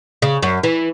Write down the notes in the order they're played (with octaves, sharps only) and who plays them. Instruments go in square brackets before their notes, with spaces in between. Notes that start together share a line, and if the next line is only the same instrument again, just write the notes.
[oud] C#3
F#2
E3